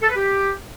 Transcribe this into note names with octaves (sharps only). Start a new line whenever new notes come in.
A4
B4
G4